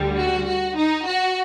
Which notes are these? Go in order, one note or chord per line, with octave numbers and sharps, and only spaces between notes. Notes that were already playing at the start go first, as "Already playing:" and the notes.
Already playing: D2 D3 G3
F#4
F#4
D#4
F#4